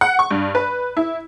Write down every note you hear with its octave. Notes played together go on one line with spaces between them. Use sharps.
F#5
C#6
G2
B4
E4